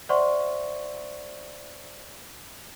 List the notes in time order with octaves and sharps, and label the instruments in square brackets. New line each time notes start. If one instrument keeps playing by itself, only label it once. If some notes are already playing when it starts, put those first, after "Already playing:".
[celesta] C5 D5 E5 F#5 C6 C#6